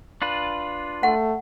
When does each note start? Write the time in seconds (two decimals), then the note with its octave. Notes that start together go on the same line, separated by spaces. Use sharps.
0.22 D4 F4 B4
1.03 A3 F#5